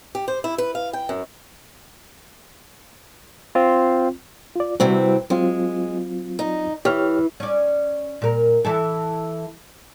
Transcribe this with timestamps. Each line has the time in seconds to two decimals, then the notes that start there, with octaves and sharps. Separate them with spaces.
0.15 G4
0.28 C5
0.44 E4
0.58 B4
0.75 F5
0.93 G5
1.09 F#2
3.55 C4 F4
4.56 F4 D5
4.80 C3 E3 G3 C4 F#4
5.30 F#3 G#3 C4 F4
6.39 D#4
6.85 E3 G4 C#5 F6
7.40 C#4 D5
8.22 A#2 A#4
8.65 E3 E4 A4